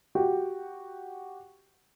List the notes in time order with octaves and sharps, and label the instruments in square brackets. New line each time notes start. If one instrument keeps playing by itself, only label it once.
[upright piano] F#4 G4 G5